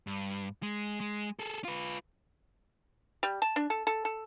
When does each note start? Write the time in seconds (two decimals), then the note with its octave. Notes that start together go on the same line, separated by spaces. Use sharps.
0.07 G2
0.63 G#3
1.00 G#3
1.39 G#4 A4
1.64 F4 B4
3.23 G3
3.42 A5
3.56 D4
3.70 A4
3.87 A4
4.05 A4